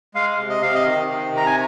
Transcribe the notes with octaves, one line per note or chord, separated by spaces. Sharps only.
G#3 F5
C3
D#5
C3 F5
D#5
D#3
C3
C3 A#5
G#5